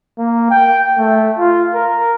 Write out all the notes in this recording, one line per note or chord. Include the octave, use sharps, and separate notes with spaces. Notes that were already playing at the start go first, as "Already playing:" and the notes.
A#3
G5
A3
F4
A#4